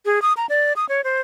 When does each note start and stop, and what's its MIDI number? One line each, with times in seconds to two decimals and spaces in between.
0.05 0.22 68
0.22 0.33 87
0.37 0.46 82
0.49 0.73 74
0.76 0.88 87
0.89 1.01 73
1.04 1.21 72